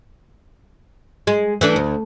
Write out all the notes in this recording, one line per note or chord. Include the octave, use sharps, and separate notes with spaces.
G#3
E3 A3 D4
D2